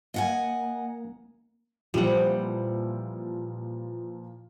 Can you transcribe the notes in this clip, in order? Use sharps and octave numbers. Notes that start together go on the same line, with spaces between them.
A#3 D#5 F#5 G#5
A#2 E3 F3 G3 C4 F#5